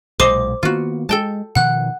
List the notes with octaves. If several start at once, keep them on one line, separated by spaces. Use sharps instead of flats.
B1 A#2 G#3 C5 D#5 D6
D#3 A#3 B3 F4 F#4
G#3 A4 G5 A5
B2 D#3 F3 F#5 F#6